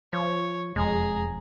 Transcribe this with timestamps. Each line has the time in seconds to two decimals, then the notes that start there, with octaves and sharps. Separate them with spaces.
0.13 F3 C#5
0.76 E1 F2 G#3 G#4 A#5